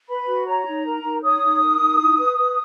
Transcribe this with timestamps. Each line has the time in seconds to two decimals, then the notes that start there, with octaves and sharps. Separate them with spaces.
0.08 B4 B5
0.27 F#4
0.46 C#5 A#5
0.66 D#4
0.85 A#4
1.03 D#4
1.23 C#5 D#6
1.42 D#4
1.62 A#4
1.80 D#4
1.99 E4
2.18 B4
2.38 B4